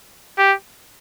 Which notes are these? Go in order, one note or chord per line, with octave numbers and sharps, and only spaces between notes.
G4